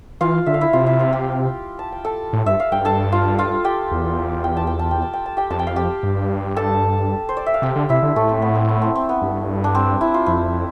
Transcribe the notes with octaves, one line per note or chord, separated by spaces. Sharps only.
E3 F4 F5
D3 E5
F5
E4 E5
C3 F4 F5
E4 E5
F4 F5
G4 G5
A5
G5
A4 A5
A2
G2 E5
F5
G2 G5
A4 A5
F4 F5
F4 F5
G4 G5
E2
G5
A5
G5
A5
G5
A5
G5
A5
G4 G5
F2 A5
G5
F5
G4 G5
G2
A4 A5
C5
D5
E5
F5
C3 G4 G5
D3
C3 E4 E5
D3
A2 A3 A4
C4
B3
C4
B3
C4
C4
B3
G2
D4
C4
E4
F4
F2 E4